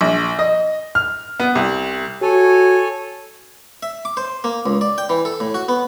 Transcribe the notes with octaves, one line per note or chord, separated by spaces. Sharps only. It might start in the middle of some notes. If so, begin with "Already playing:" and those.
A#1
D#5
F6
B3
C2
F#4 A4 C#5 G#5
E5
D6
C5
A#3
C#2
D5
G5
E3
A4
A2
F#4
B3